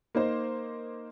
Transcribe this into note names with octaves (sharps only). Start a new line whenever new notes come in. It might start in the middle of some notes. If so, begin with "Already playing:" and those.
A#3 D#4 C5